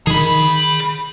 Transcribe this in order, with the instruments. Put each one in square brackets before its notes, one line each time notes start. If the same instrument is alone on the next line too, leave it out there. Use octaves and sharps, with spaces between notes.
[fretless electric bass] D#3 [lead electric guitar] G#4 B5